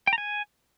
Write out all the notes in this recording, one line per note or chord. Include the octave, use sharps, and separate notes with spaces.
G5
A#5
G#5